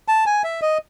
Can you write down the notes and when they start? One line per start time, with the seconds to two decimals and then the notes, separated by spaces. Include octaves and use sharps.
0.08 A5
0.26 G#5
0.44 E5
0.62 D#5